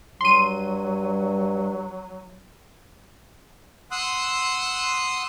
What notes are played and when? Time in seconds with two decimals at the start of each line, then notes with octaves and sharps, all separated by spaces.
0.21 G2 F#3 C6 D#7
3.91 F#5 C6 D#6 E6 F#6